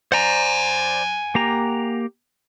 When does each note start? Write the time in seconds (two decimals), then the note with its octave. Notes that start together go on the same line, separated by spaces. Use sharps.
0.12 C5 D5 F#5 G#5 A#5
1.35 A#3 G4 A#5